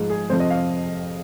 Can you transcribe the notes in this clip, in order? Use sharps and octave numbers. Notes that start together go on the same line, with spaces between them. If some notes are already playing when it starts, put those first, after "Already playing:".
Already playing: G#2 F3
G#4
F2 C3 F3 C5
D#5
F5